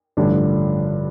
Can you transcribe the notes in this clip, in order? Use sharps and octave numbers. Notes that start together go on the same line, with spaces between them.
A1 G2 D3 F3 D4